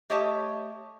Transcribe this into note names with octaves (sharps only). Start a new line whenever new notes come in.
A3 G4 C#5 D#5 E5 A5